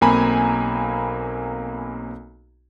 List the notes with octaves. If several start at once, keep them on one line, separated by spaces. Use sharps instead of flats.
B1 A#3 C4 G#5 A#5 B5